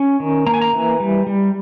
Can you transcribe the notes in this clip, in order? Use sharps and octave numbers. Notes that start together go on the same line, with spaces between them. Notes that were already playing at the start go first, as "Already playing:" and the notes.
Already playing: C#4
D#3
A#3 A#5
G#5
A#5
E3
G3
G3